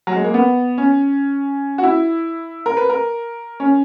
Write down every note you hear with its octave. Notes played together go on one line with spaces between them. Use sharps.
F#3
G#3
A#3
B3
C#4
F#4
E4
A#4
B4
A#4
C#4